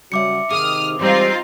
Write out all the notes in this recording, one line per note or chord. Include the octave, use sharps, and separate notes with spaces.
C#3 F#3 G3 C#4 F#4 E5 D6 C#7
C3 D#3 G#4 F5 D6 D#6 F6
E3 G3 G#3 C4 D#4 F4 C5